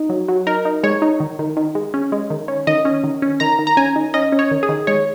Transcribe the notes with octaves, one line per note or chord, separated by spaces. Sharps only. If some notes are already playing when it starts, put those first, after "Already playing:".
Already playing: D#4
F#3
F#3
D#4 A#4
D#4
G#3 C#5
D#4
D#3
D#3
D#3
G#3
C#4
G#3
D#3
C#4
D#3 D#5
C#4
D#3
C#4
D#3 A#5
D#3
A#5
C#4 G#5
D#3
C#4 D#5
C#4
C#5
D#3
G#4
D#3
G#3 C#5